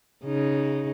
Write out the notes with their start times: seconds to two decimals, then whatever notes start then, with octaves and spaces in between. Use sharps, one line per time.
0.24 C#3 D#4